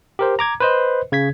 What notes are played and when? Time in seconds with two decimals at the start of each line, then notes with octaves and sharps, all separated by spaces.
0.19 G4 A#4 C5
0.39 A#5 D6 G#6
0.60 B4 C5 D#5
1.12 C#3 G#6 B6